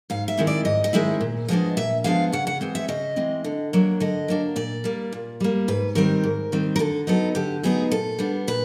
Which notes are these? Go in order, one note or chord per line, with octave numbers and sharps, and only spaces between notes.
G#2 F5
E5
D#3 G#3 C4 E4
D5
G#2 D#5
D#5
D#3 G#3 C4 E4 E5
A#2
F3 G#3 B3 D4 D#5
A#2 E5
F3 G#3 B3 D4 F5
C#3 F#5
F#5
E3 G#3 C4
E5
C#3 D#5
E3 G#3 C4
D3
F#3 A#3 D4
D3 D#5
F#3 A#3 D4
A#2 D5
G3 A#3
A#2
G3 A#3
G#2 B4
D#3 G3 C4 A#4
G#2
D#3 G3 C4
A#4
D3 A4
F#3 B3 D#4 A4
D3 G4
F#3 B3 D#4 G#4
A#2 A4
G3 B3 D4
A#2 B4